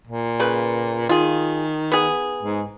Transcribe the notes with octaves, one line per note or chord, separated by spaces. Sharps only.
A#2
C#3 B4
D#3 F4 G#4
B3 G#4
G#2